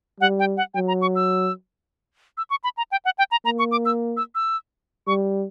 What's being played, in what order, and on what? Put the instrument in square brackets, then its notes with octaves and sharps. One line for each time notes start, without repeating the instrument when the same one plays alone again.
[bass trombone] G3 [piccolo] F#5
[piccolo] G5
F#5
[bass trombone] F#3 [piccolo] G5
[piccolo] A#5
C#6
E6
E6
C#6
B5
A#5
G5
F#5
G5
A#5
[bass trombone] A#3 [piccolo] A#5
[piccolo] C#6
D6
E6
E6
E6
[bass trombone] G3 [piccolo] C#6